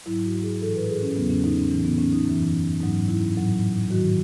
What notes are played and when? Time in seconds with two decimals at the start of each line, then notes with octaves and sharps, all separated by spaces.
0.06 G#2 F#3 E4
0.24 F#4
0.43 G#4
0.62 A2 E3 A4
0.75 B4
0.89 G#4
1.02 C#4
1.16 E2 C#3 F#3 B3
1.30 C#4
1.44 D#4
1.58 C#4
1.71 A2 E3 C#4
1.85 B3
1.98 C#4
2.13 D#4
2.26 F#2 E3
2.81 G#2 F#3 D#4
3.08 E4
3.35 A2 F#3
3.90 G#2 D#3 F#3 F#4